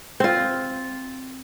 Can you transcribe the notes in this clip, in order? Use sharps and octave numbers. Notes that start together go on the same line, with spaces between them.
C4 F4